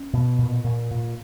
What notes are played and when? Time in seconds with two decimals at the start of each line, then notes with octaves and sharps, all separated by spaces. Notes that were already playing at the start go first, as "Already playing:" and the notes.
Already playing: C#4
0.13 B2
0.38 A#2
0.64 A#2
0.91 A#2